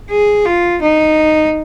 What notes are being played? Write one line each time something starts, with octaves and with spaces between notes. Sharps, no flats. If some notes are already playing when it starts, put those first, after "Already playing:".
G#4
F4
D#4